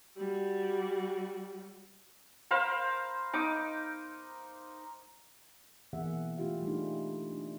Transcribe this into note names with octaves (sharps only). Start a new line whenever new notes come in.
G3 F#4
A#4 C5 F5 B5
D#4 D6
B2 E3 A#3 G#4 E5 F#5
A3 E4 F4 G4 F5
G3 A3 D4 D#4 G4 G#4
D4